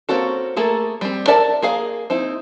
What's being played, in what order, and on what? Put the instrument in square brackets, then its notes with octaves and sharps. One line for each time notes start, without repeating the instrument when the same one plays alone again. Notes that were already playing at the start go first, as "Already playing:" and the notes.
[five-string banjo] A#3 C4 C#4 F#4 A4
A3 A#3 G#4 A4
G3 C4
A4 A#4 D5 E5 A5
A#3 G#4 F5
C4 D#4 E4